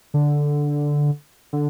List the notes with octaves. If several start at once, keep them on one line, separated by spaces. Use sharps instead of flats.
D3
D3